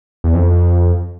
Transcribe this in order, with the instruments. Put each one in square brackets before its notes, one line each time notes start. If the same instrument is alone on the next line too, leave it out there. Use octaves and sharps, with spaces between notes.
[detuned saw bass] E2
F2